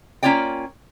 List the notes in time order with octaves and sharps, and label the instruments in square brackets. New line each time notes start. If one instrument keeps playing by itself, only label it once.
[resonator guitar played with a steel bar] A#3 C#4 F4 C#5 D5 G5